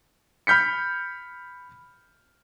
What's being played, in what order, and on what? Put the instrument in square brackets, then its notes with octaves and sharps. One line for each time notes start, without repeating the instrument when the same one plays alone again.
[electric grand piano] B5 F6 G6 B6 C#7